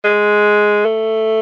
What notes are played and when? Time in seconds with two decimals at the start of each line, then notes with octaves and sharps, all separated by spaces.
0.04 G#3
0.86 A3